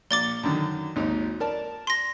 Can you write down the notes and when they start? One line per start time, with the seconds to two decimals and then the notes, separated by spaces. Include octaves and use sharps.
0.11 A#1 D6 A6 G7
0.43 F#2 D3 D#3
0.96 G#1 D#2 D#4
1.40 A#4 D5 A5
1.87 C6 A#6